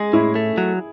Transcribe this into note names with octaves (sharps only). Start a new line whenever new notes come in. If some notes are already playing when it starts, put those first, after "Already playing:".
Already playing: G#3 G#4
A2 E4
A3
F#3